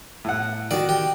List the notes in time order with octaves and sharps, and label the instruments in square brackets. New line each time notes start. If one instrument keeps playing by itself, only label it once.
[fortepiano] A2 F#5
[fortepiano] D#3 F#4 [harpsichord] D5
[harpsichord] G4